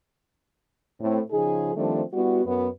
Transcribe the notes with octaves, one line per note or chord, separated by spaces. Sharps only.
A2 C4
C#3 F3 D#4 G#4
D#3 F3 G3 A3 C4 D4
G3 B3 E4 F#4
F#2 B3